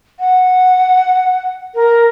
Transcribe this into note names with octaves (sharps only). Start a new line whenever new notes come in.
F#5
A#4